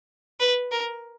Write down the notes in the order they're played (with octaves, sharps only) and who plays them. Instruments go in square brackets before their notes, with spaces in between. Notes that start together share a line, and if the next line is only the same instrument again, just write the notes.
[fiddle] B4
A#4